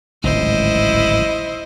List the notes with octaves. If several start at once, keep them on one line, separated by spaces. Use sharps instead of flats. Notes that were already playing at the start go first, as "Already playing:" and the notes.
D1 G#1 C#2 E4 C5 D#5